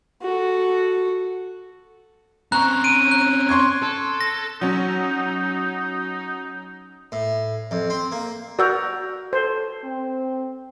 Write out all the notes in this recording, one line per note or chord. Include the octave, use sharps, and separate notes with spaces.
F#4 A4
C4 C#4 A#5 C#6 F#6
D7 D#7
F#6
C6 C#6 G#6
A4
A#6
F#3 C#4 D#4
A2
F2
C4
A#3
F#4 A#4 D5 E6 G6
A4 C5
C4